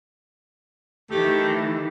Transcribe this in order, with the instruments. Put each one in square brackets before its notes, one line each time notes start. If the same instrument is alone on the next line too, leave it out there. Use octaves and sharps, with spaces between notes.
[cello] D#3 E3 [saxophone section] A3 G4